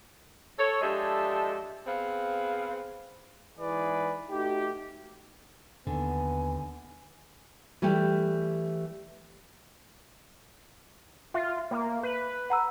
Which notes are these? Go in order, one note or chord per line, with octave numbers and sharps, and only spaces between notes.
A4 C#5
F3 G#3 D4 G4 A4 E5
B3 C4 G#4 F5
G#2 E3 E4 G#4 B4 D5
A3 D#4 F#4 G4
D#2 D3 D#3 B3 G#5
E3 G3 A3 G4
F4 E5
A#3
B4
F#5 A#5 E6